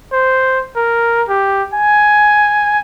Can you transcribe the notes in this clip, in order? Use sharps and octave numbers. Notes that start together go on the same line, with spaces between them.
C5
A#4
G4
G#5